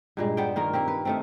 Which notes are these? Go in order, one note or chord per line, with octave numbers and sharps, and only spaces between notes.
G2 A#2 G#3
B3 C5 D5 G5
D#3 A#3 F4 A#4
A#3 C4 G4
B4
D#3 A3 C4